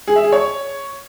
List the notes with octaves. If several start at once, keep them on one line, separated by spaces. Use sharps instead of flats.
G#4
E5
G#4
C#5